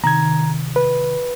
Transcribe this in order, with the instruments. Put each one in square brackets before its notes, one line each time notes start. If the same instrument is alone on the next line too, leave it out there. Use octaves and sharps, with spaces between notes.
[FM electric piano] C3 D#3 [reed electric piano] A#5 G#6
[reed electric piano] B4